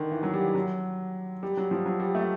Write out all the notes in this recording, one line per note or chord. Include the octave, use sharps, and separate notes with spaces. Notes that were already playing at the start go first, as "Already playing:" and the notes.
Already playing: D3 D#3
E3
F#3
G3
E3
F#3
G3
F#3
F3
F#3
G3
A3